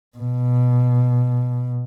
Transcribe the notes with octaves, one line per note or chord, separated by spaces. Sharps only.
B2